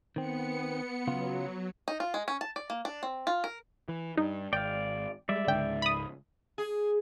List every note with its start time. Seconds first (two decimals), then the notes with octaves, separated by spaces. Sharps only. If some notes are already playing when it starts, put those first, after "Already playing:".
0.16 D#3 B3 C4 C#7
1.07 C#3 F#3 B3 F4
1.88 D#4
2.00 F4
2.14 G#3
2.28 C#4
2.41 A5
2.56 D5
2.70 A#3
2.85 D4
3.03 C4
3.27 F4
3.44 A#4
3.89 E3
4.17 G2 D#4
4.53 G#1 D5 F5 G5
5.29 G3 G#3 D5 E5
5.47 C#2 G#2 D3 G5
5.82 B5 D#6
6.58 G#4